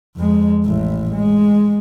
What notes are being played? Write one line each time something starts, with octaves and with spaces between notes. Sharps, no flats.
F2 G#3
A1 A2
G#3